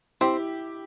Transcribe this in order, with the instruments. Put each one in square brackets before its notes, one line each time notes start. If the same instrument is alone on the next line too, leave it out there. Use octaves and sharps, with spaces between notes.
[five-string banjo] C4 [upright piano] E4 G4